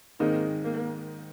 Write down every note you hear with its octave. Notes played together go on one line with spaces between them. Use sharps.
G#2 D#3 G#3 A#3 C4 D#4
A#3